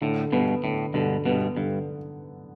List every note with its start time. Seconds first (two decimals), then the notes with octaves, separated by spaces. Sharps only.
0.01 A2 D3
0.32 G2 B2 B3
0.64 A2 D3
0.94 G2 B2 D3
1.25 G2 B2 B3
1.57 G2 D3